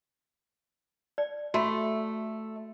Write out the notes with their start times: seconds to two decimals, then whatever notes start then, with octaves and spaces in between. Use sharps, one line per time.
1.18 D5
1.54 A3 F#4 B5